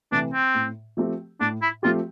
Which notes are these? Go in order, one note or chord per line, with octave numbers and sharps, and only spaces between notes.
C3 E3 A3 D4
C4
A2
F3 A3 C4 G4
A2 D4
E4
F3 A3 C4 F4 G4